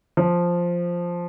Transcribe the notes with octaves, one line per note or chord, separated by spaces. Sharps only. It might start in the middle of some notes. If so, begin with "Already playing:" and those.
F3